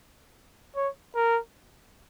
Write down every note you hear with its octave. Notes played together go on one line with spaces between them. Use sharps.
C#5
A#4